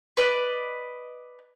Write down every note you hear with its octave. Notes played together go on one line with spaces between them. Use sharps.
B4 D5 D#5